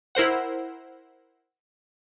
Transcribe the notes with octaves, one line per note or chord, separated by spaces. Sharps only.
E4 A#4 C5 F#5